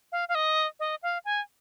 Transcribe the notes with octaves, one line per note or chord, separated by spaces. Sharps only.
F5
F5
D#5
D#5
F5
G#5